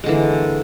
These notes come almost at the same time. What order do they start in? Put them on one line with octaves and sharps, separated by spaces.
G#3 D3 E3 A#3